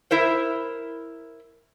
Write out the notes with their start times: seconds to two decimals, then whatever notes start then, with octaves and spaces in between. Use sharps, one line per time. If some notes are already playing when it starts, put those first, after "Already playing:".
0.11 E4 A#4 C5